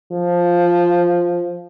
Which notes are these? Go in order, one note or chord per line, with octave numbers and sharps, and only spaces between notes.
F3